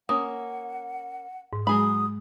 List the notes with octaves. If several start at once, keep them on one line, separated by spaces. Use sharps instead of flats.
A#3 C#4 F#5 D#6
G#2
F#3 G#3 G#4 B5 D#6